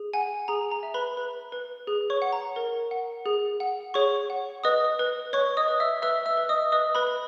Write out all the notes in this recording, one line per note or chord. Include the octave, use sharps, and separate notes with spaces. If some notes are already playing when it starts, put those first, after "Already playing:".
Already playing: G#4
F#5 G#5
G#4 A#5
A#5
E5
B4 B5
B4
B4
G#4
C#5 C#6
F#5
A#5
A#4
F#5
G#4
F#5
G#4 C#5 C#6
F#5
B4 D#5 D#6
B4
B4 C#5 C#6
D#5 D#6
B4
E5 E6
B4 E5 E6
E5 E6
B4
D#5 D#6
B4 D#5 D#6
B4 B5
B4